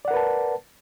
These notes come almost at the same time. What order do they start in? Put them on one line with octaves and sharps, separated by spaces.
D5 F#5 A#4 B4 A5